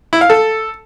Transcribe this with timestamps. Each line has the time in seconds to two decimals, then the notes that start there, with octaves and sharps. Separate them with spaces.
0.13 E4
0.21 F5
0.30 A4